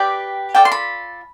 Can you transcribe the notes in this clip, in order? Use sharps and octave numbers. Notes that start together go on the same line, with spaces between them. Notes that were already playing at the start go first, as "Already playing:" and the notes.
Already playing: G4 B4 D5 G5
F4 A4 D5 G5
C6
B5